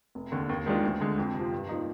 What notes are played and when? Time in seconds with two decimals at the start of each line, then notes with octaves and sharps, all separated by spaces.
0.15 F1
0.32 D#2 D3
0.49 D#2
0.66 D#3 G#3 D4 F4
0.83 D2
1.01 D3 G#3
1.18 F2
1.35 C3 F3
1.52 G2
1.69 F3 A#3 D#4